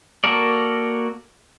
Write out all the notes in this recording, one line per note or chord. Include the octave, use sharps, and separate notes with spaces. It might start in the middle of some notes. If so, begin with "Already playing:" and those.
A#3 F#4 A4 A#4 D5